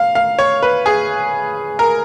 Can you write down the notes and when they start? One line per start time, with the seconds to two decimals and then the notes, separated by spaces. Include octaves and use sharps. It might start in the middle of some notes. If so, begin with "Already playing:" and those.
Already playing: F5
0.15 F5
0.39 C#5
0.62 B4
0.86 G#4
1.79 A#4